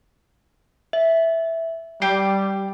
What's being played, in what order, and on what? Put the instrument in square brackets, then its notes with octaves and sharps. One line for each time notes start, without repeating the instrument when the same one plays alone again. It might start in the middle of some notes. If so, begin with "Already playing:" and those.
[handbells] E5
[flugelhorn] G3 [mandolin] G4 [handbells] C7